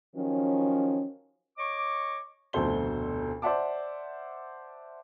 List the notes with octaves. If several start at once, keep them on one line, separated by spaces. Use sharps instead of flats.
D#3 F3 F#3 C#4
C#5 D#5 C#6 D6
F1 D2 B2 A4 C5 G7
C5 D5 E5 F#5 A5 D6